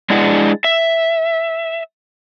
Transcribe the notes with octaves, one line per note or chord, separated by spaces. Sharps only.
G#3 D4 E4 G#4 D#5 F#5
E5